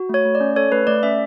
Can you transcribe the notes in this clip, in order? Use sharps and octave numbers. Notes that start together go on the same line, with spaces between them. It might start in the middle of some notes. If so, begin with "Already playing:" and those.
Already playing: F#4
A3 C#5
A3
D5
C#4
A4 C#5
A3 B4
A3 D5
C#4 E5